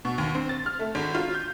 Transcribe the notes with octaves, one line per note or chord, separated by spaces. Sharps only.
B2
D#2
C4
A6
F6
A3
G#1
F4
G6